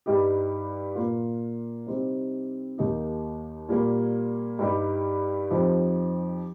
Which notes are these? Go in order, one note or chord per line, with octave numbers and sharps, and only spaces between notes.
G2 G3 D#4 G4
A#2 A#3 F4
C3 G3 C4 D#4 G4
D#2 D#3 A#3 D#4 G4
A#2 G3 A#3
G2 G3 D#4 G4
F2 F3 D#4 G4